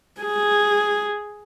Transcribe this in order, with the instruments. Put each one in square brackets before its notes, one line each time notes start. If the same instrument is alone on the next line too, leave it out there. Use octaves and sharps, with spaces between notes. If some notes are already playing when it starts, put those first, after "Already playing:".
[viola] G#4